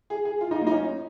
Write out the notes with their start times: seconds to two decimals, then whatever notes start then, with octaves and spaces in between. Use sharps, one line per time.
0.10 G#4
0.25 G#4
0.41 F4
0.51 D#4
0.61 A#3
0.67 D#4
0.71 C#4